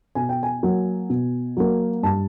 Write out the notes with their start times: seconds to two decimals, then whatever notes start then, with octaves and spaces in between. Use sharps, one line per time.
0.15 B2 G#5
0.29 G5
0.43 G#5
0.63 F#3 A#3
1.10 B2
1.57 F#3 A#3
2.03 G2 A5